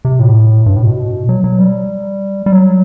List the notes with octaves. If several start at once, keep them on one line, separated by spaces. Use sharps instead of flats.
C3
A2
G2
A2
C3
B2
F#3
F#3
G3
G3
F#3